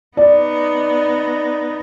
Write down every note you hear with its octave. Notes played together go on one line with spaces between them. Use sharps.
B3 D#4 D5